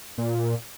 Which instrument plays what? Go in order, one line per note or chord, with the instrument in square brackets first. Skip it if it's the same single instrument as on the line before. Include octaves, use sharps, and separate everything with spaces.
[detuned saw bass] A#2